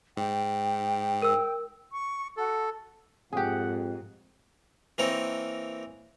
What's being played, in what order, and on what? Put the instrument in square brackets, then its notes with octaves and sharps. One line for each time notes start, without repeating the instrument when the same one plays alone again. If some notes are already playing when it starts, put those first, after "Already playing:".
[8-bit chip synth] G#2 [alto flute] G5
[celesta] A#4 E6
[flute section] C#6
[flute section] F#4 F#5 [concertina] A4
[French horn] F2 [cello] G#2 [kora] G4 G#4 [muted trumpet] F#5
[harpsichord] E3 A#3 C4 D#4 A#4 C#5